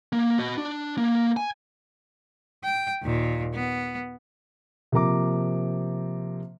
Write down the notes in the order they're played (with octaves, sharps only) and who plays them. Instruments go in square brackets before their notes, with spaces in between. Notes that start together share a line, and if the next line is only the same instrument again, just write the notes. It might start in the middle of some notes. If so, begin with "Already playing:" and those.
[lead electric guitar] A#3
F#4 D#5
D4
A#3
G#5
[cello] G5
D#2 A#2
B3
[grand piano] C3 F3 A#3 A#5 D6